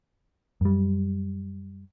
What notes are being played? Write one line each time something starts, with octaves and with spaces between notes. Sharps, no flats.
F#2 G3